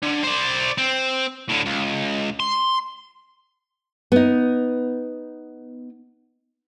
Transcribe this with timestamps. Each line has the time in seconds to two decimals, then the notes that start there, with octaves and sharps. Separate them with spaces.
0.03 D3
0.24 C5 D5
0.78 C4
1.49 A2 D3
1.66 C#2
2.40 C6
4.12 B3 D#4